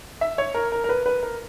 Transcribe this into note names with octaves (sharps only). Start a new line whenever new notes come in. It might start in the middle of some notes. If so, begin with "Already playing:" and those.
E5
C#5
A#4
A#4
A#4
B4
B4
A#4